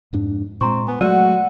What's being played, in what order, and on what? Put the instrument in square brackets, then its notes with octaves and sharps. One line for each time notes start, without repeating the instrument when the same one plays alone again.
[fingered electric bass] F2 G#2 D4
[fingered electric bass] A#2 G#3 [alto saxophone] C4 [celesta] A#5 C6 C#6
[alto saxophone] B3 [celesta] G#5
[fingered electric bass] F#3 G#3 A3 [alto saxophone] F#4 [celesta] D5 E6 D#7 [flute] F#5